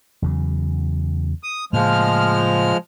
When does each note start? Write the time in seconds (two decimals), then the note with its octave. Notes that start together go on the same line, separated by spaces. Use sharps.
0.22 E2 C#3 F#3
1.43 D#6
1.73 A2 C#3 F3 G#3 A#3 F6